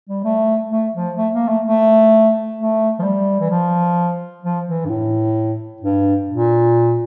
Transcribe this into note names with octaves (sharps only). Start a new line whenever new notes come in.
G3
A3
A3
F3
A3
A#3
A3
A3
A3
F3
G3
E3
F3
F3
E3
G2
A2
G2
A#2